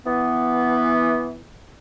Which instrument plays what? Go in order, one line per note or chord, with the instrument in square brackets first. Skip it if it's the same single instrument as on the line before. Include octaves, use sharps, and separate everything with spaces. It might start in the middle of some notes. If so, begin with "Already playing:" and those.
[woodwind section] E3 B3